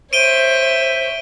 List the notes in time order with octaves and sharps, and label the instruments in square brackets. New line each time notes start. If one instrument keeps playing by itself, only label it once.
[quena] C5 [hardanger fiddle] C#5 E5 [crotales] D7 D#7 G7